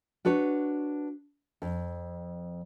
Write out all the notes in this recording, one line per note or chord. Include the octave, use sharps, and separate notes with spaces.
D4 F#4 B4 C#5
F2